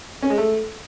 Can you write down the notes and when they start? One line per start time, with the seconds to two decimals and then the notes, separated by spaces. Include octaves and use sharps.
0.23 C#4
0.30 G#3
0.38 A3